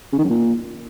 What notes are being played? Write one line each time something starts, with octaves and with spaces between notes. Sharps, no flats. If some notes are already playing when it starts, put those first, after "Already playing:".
C#3
D#3
F#2
A#2